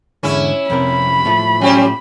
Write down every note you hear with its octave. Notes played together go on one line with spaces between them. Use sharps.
E2 G#2 D3 C#4 E4
F2 C3 A#4 B5
A2 F3 A3
F#3 C#4 G4 C5